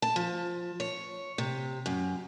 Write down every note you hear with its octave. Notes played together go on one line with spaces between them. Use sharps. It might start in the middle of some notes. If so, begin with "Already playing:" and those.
A5
F3
C#5
C3
F#2